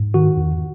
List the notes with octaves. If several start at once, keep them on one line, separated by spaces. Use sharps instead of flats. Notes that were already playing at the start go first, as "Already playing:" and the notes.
Already playing: G#2
D#3 F#4
E2